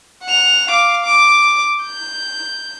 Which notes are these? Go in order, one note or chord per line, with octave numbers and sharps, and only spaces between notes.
F#5 F7
F5 D6
D6
G6